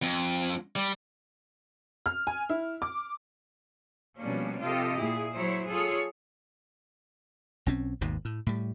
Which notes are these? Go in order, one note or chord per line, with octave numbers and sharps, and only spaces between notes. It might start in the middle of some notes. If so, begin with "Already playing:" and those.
F2
G3
F6
G#5
E4
D6
B2 F3 G3 A#3 C#4 D4
C3 F4 G4 A4 D#5
A#2 E4 G#4
F#3 E4 C5 C#5
F4 G#4 A4 C#5
B1 C4 C#4
G#1 D#2 G#2 B2
A2
A2 G3